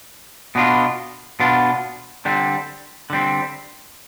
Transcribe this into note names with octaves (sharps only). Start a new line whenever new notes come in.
B2 B3 D4 F4
B2 B3 D4 F4
D3 G3 C4
D3 G3 C4